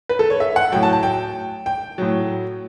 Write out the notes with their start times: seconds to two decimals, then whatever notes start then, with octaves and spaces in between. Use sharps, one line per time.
0.09 B4
0.19 A4
0.30 C#5
0.40 E5
0.56 F#5
0.72 F#3 G5
0.75 A2
0.83 A5
0.93 A5
1.03 G5
1.66 G5
1.98 A2 F#3